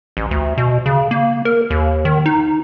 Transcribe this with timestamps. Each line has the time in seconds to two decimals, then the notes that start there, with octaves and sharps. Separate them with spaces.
0.17 A1
0.31 D2
0.58 B2
0.86 C#3
1.11 A#3
1.45 A#4
1.70 D#2
2.05 D#3
2.26 D#4